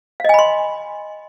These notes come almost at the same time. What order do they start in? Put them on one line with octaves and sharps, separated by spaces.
F5 D#5 G#5 B5 C6